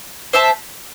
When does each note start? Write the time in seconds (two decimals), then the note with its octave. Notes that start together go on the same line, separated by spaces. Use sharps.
0.33 C5 E5 A5